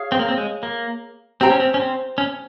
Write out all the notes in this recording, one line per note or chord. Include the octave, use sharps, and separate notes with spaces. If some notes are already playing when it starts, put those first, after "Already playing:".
Already playing: G#4 C#5 F5
C4
A#3
C4
G#3
A#3
C4 G4 C5 G5 A#5
C#4
C4
C#4
C4
C#4